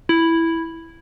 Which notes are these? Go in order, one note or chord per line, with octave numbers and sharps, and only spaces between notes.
E4